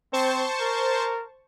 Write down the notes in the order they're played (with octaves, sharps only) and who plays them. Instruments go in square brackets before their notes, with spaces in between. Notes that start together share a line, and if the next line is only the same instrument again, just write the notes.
[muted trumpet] C4 [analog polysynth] C5 A5 C#6
[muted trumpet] A#4